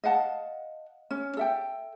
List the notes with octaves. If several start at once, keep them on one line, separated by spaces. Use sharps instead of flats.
D#5 F5 F#5 A5
C#4
A4 E5 G5